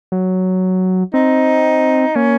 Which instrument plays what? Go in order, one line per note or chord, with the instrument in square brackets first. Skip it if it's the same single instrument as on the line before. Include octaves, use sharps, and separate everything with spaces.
[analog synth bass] F#3
[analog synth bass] C4 [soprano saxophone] D#4
[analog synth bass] A#3 [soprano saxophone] C#4